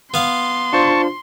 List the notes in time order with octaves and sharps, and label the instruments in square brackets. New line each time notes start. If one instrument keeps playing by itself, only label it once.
[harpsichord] B3 F5 [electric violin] C6
[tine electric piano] D4 F4 C5 [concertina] A5 C#6